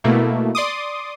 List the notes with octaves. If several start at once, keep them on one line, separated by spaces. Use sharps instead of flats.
B2 A3 A#3 E4
D5 C6 D6 D#6